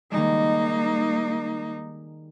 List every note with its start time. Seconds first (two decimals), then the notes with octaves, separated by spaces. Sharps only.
0.11 D#3 G3 G#3 A#3 D#4